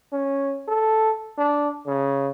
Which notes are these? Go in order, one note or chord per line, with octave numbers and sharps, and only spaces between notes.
C#4
A4
D4
C#3